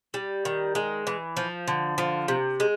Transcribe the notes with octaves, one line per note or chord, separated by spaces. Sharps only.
G3
D#3
G#3
E3
F3
D3
F3
C3
G#3